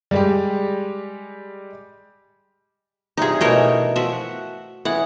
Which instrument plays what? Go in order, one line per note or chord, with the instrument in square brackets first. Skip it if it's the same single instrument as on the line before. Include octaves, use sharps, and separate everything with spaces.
[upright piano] G3 G#3 G4
[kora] G2 C3 F4 [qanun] D#4 G#4
[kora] B2 E3 G4 [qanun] A3 A#4 C#5
[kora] G5
[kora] F3 [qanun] F#4 E5
[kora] F#5
[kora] E3 C#4 G#4 [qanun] F#5